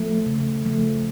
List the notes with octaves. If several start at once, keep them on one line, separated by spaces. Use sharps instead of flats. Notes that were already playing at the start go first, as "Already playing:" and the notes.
Already playing: F3 A3
C#3
F3 A3